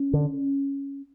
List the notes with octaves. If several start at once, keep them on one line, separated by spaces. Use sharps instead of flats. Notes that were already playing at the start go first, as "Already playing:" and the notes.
Already playing: C#4
D3